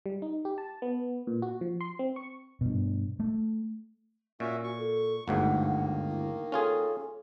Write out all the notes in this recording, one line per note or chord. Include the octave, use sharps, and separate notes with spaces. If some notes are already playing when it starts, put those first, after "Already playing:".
G3
D#4
G4
A5
B3
A#2
F#4
F3
C6
C4
C#6
G2 B2
A3
A#2 C#4 F#4 E5
F#4 C#6
A4
G1 D2 G#2 D#3 A#3 F#5
E4
C#4 F4 G#4 A4